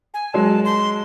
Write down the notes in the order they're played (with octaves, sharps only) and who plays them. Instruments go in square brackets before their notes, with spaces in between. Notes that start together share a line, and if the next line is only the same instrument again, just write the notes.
[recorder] G#5
[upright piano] F#3 G#3 [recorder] A5
[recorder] C6